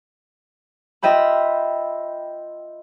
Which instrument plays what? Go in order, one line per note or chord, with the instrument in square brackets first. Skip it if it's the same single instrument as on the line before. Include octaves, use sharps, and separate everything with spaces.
[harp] F4 D#5 E5 G5 B5